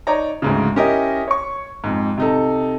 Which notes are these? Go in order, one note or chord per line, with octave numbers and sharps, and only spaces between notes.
D#4 C#5 D5 A#5
D2 G#2 C#3
C#4 E4 G4 A#4 D#5
C#5 C#6
F2 G#2
C3 D#4 A4